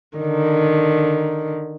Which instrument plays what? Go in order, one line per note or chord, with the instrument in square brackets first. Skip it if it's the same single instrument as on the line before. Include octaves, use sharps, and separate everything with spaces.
[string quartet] D3 D#3